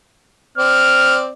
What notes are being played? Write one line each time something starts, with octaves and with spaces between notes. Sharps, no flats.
C4 D5 F6